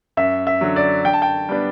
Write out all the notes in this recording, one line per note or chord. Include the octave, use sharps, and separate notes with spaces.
F#2 E5
E5
D3 F#3
D5
D3 G5
A5
G5
G3 B3 D4